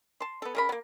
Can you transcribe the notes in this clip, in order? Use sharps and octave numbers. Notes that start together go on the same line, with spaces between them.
A5 C6
B3 A4
C#3 A#4 B5
A#3 B3